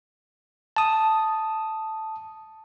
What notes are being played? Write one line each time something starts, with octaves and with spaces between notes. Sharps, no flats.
A5 D#6